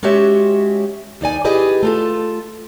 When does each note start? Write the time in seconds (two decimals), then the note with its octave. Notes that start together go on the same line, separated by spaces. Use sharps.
0.03 G#3 C#4 F#4 G4 C#5 E5
1.21 D#2 D#4 D5 G#5
1.44 E4 G4 G#4 B4 D5 D#5
1.83 A3 F4 A4